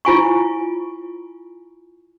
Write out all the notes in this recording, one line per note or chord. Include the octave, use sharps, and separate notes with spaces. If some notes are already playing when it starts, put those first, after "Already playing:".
E4 F4 G#5 C#6